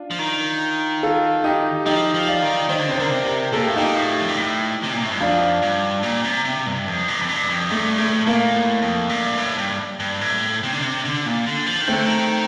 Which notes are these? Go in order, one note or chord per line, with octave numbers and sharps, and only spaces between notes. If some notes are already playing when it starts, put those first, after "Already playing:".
Already playing: D4 F4
F3
D#3
F4 A4
D#4 G4
F3 D#4 G4
F3
D5 F5
D#3
D#3 C5 D#5
D3
C3 C5
D3 A#4 D5
C3
G4 A#4
A#2 A4
G4
A2 F4
A#2 D#4 G4
A2
F2
G2
A2
C3
A#2
A2
G2
F2 D4 F4
G2
A#2
C3
C3
G2
F2
G2
F2
G2
F2
G2 A3
A2 A3
A#2 A#3
A2
F2
G2
A2
G2
G2
A2
C3
D3
C3
D3
A#2
D3
F3
D#3
D3 A3 C4
D#3